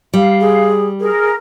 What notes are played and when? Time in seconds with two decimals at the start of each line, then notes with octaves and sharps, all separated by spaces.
0.13 G3 F5
0.41 G#4
1.00 G#4 A#4